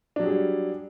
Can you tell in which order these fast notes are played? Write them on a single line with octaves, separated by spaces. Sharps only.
D4 F#3 G4 G#4 G3